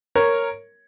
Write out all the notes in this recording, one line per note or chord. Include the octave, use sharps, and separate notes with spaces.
A#4 C#5